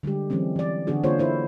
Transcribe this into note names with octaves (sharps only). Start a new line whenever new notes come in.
D3 G3 G#3 G4
E3 F#3 G#3 C4 C#4
E3 D5
D3 E3 B3 D4 F#4 G#4
D3 A#3 F4 G#4 C5 C#5
D4 E4 C5